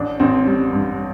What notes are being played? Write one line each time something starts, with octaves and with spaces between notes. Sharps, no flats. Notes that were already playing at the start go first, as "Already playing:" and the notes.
Already playing: A1 D4
A1 C4
G3
G2